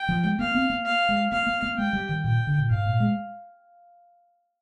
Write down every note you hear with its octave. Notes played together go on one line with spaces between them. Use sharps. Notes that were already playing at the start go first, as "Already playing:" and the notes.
Already playing: G5
F3
G#3
A#3 F5
C4
A#3
F5
G#3
A#3 F5
A#3
A#3
G#3 G5
G3
D#3
A#2 G5
D3
A#2
G#2 F5
A#2
G#3